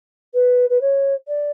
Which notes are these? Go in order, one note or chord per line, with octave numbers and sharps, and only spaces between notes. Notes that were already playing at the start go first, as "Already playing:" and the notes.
B4
B4
C#5
D5